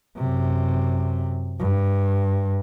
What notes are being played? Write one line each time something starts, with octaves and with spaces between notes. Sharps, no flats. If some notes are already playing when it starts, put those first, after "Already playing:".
F#2 C3
G2